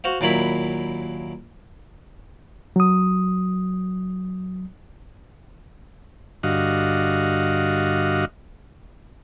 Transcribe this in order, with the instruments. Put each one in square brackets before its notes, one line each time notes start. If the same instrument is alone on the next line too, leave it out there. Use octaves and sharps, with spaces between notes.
[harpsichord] F#4 C5 F5
D#2 A#2 F#3 E4 B5
[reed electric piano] F#3 D#6
[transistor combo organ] G2 D3 F#4 D#5 F5